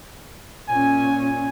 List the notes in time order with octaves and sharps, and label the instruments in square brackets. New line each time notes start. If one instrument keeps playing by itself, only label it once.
[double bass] A#2 C#4 [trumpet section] G#5